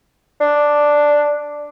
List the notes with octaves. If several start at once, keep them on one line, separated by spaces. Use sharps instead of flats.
D4